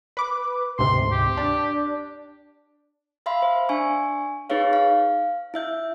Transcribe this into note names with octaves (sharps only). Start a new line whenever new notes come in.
B4 D6
D2 G#2 C3 C6
G4
D4
E5 F5 B5 C6
C5
D4 G#5 C#6
D#4 G#4 B4 C#5 F5
F5
E4 E5 G6